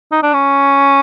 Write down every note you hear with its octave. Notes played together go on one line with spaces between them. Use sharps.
D#4
D4
C#4